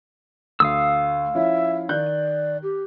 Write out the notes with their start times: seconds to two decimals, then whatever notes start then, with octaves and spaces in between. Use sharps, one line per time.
0.60 D2 F5 D#6 E6
1.35 F3 C#4 E4 E5
1.89 D#3 D5 F#6 G6
2.63 G4